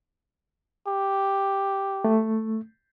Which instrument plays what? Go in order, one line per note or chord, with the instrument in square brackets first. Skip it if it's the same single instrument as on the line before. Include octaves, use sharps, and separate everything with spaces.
[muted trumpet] G4
[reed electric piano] A3